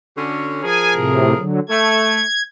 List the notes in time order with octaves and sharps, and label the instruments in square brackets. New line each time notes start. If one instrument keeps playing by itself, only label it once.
[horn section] D3 C#4 F#4
[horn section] F3 G#4 A#4 [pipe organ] G#5
[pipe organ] A2 C3
D3 F#3
[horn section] A3 [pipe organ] G#6